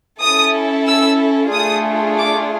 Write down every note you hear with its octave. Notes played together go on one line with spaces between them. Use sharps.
C#4 E4 A4 D#6
E6
A3 D4 F4 G#4 D#6
D6